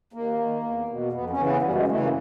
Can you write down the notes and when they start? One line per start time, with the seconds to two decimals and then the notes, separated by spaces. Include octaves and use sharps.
0.13 D#2 A#3
0.38 D#3
0.63 E2
0.89 B2
1.12 F2 B3
1.30 C#4
1.37 C#3 E3
1.46 B3
1.62 F#2 G3
1.75 G#3
1.88 E3 A3
1.92 C#3
2.00 A#3